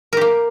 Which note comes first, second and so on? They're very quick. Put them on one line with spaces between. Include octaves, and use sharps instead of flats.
A#4 G4 A#3